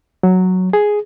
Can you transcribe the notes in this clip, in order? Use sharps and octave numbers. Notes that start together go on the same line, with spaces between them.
F#3
G#4